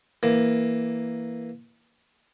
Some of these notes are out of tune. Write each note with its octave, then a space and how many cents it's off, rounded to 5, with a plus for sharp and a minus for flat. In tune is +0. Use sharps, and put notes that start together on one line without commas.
E3 +0 A#3 +0